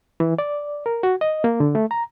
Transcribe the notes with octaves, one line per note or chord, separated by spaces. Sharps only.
E3
D5
A#4
F#4
D#5
A#3
D3
A3
A#5